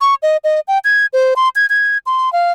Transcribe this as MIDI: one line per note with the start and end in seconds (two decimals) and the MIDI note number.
0.01 0.15 85
0.23 0.37 75
0.44 0.60 75
0.68 0.79 79
0.85 1.06 92
1.13 1.34 72
1.36 1.49 84
1.56 1.66 92
1.70 1.98 92
2.06 2.32 84
2.33 2.52 77